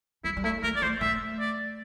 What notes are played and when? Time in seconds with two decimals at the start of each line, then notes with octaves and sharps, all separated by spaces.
0.24 G3 E4
0.37 G3
0.44 A3 E4
0.63 A#3 A#4
0.76 D5
0.82 A3 C5
1.01 A3 E5
1.39 D5